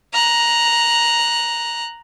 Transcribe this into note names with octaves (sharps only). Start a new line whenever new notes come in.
A#5 F#6